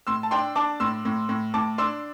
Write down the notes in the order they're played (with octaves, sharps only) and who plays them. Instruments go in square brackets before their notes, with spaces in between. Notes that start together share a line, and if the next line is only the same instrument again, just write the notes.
[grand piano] A2 C6 E6
A5
D4 G5 C6
D4 A5 D6
A2 C6 E6
A2
A2
A2 A5 D6
D4 C6 E6